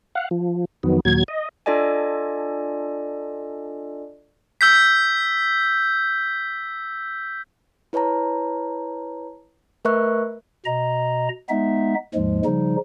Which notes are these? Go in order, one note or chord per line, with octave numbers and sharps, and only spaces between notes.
F5 F#5
F3
F2 D#3 F#3 B3
D#2 A#2 F#3 G#6
D#5
D4 F4 A4 D5 D#5 G#5
E6 G6 B6
E4 B4 C#5 A5 A#5
A3 A#4 B4 E5 C#6 F#6
B2 D#5 A#5
G#3 B3 D#4 E5
D#2 G#2 F3 G#3
C#3 F3 G3 D#4